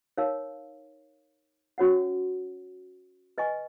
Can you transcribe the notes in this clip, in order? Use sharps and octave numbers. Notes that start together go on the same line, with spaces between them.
D#4 A#4 C#5 F5
C#4 F#4 C#5 F#5
B4 D#5 G#5 C#6